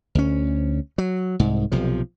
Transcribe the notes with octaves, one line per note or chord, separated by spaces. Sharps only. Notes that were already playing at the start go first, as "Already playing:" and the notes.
D2 C#4
F#3
C2 G#2
B1 C3 F3